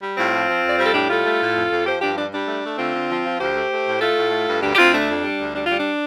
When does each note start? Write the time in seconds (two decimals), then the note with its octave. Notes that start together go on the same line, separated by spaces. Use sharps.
0.02 G3
0.17 A2 C4 F4
0.33 F3
0.48 F3
0.63 F2
0.68 D5
0.77 G3 C5
0.85 A4
0.93 A2 D4 G4
1.09 G3 F4 A4
1.25 A3
1.41 A2
1.56 F2
1.71 F2
1.86 F3 G4 C5
2.02 G2 D4 G4
2.17 G3 D4
2.32 G3 D4
2.48 A3
2.63 A3
2.78 D3 C4 F4
2.94 D3
3.09 F3
3.24 F3
3.39 D2 G4 C5
3.55 A3
3.71 A3
3.85 A2
4.00 A3 F4 A4
4.16 A2
4.32 A3
4.47 G2
4.62 D2 D4 G4
4.73 G4
4.77 D2 C4 F4
4.93 A3 D4
5.08 F2
5.23 G3
5.39 D2
5.55 G3 D4
5.67 G3 F4
5.80 D4